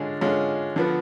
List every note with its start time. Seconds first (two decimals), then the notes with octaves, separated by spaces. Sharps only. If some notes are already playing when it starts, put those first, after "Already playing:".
Already playing: D3 G#3 C#4 D4 F4
0.21 D3 G#3 C#4 F4
0.76 D3 F3 B3